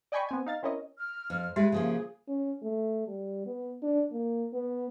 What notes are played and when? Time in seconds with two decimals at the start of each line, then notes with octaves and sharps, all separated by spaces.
0.12 D5 D#5 G5 G#5 B5 C#6
0.29 B3 C4 G#5
0.46 D#4 F5 A6
0.63 C4 C#4 E4 A#4 C#5 D#5
0.98 F6
1.30 F2
1.56 G#3 G4 B4 E5
1.72 C#3 F3 A#3 G#4
2.28 C#4
2.63 A3
3.07 G3
3.46 B3
3.83 D4
4.12 A#3
4.53 B3